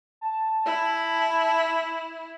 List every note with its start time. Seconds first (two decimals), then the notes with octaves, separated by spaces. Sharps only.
0.21 A5
0.66 E4